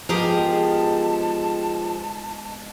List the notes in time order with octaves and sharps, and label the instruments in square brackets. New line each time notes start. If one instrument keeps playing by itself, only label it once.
[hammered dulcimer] G#2 B2 [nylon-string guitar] F3 [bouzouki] G4 G#4 A#4 [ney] A5